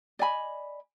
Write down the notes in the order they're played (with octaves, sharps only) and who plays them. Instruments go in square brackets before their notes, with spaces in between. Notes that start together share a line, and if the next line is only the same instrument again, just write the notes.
[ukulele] D5 D#5 G#5 B5